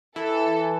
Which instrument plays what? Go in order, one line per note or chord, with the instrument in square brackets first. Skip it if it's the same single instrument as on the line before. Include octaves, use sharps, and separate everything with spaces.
[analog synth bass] E3 [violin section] A4